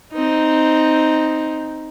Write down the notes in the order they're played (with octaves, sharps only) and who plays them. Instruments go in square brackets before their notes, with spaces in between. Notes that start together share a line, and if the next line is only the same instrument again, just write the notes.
[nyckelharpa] C4 D#4